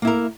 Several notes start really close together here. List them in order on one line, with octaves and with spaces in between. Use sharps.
A#3 E4 A#4